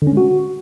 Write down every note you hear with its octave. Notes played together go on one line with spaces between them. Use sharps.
D3
C#4
G#3
F#4